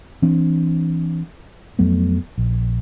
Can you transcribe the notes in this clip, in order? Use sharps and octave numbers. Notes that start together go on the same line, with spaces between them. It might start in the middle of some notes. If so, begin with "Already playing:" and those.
E3 C4 D4
F2 F#3 A3 B3
A#1